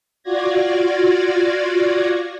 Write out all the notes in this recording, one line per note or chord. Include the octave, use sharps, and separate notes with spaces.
F4 F#4 D5 G#6 A#6